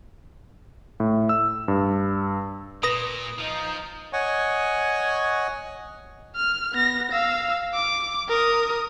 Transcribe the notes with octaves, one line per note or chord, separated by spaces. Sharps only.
A2
E6
G2
A#2 B4 D#6 A#6
F3 D#4
C#5 D#5 F#5 G#5 C#6
F6
B3 A#6
F5 E6
D6
A#4 D#6